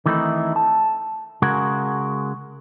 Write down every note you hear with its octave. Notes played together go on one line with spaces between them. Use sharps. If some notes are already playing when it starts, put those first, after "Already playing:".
D#3 E3 A3 C4 D#4 E4
A5
C#3 G#3 F#4 G#4 A#4